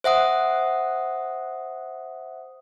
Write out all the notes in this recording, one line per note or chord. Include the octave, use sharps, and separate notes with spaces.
C5 E5 F#5 D#6